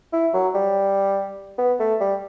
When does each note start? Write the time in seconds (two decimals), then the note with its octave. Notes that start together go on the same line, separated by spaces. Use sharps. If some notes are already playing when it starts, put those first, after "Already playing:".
0.13 E4
0.33 F#3
0.54 G3
1.58 B3
1.80 A3
2.00 G3